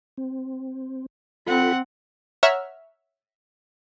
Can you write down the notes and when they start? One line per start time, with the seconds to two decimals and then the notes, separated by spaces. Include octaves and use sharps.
0.18 C4
1.46 C4 F4 A4 F#5 B5
2.43 C#5 E5 F#5 A#5 F6